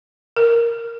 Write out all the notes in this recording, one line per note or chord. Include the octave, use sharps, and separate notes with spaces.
A#4